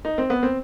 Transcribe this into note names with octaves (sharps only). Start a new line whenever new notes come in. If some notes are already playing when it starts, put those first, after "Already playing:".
D#4
C4
B3
C4